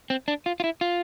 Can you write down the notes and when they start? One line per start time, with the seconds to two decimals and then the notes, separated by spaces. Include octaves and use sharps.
0.10 C4
0.28 D4
0.46 F4
0.60 F4
0.64 E4
0.81 F4